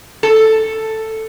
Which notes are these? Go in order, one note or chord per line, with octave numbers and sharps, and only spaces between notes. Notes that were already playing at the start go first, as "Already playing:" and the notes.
A4